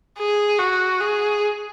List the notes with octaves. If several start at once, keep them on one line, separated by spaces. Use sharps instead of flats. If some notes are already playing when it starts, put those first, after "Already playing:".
G#4
F#4
G#4